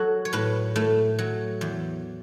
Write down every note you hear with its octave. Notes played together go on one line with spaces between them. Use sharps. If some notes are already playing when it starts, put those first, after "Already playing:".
Already playing: F#3 F#4 A4
C#5
A2 B4
A2 A3
F#3
E2